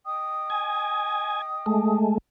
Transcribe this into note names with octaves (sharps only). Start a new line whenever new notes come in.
D#5 G5 D#6
G#5
G#3 A3